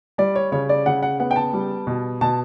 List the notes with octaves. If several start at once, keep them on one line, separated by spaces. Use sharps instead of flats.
G3 D5
C#5
C#3 C#5
D5
C#3 F#5
F#5
B3 F#5
G5
A5
G3
B2
B2 A5